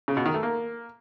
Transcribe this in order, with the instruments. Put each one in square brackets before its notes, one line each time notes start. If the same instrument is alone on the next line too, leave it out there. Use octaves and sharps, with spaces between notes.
[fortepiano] C#3
B2
D#3
A3
A#3